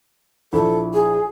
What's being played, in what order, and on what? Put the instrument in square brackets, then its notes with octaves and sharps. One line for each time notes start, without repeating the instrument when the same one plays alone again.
[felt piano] A#1 E4 [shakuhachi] A4
[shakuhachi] G#4